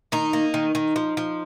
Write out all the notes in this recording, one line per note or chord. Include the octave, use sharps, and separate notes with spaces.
D#3 D#4
A#3
D#3
D#3
F3
F3